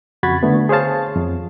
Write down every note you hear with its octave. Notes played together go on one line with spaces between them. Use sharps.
F2 C#3 F#4 B5 G#6 A6
D3 A3 B3
G#4 C5 C#5 F5 A5
F2